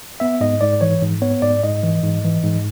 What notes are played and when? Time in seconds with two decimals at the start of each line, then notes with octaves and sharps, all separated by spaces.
0.20 B3 E5
0.40 G#2 D#5
0.61 G#2 D5
0.81 E3 C#5
1.02 G#2
1.22 B3 C#5
1.42 G#2 D5
1.63 G#2 D#5
1.83 E3
2.03 G#2
2.24 E3
2.44 G#2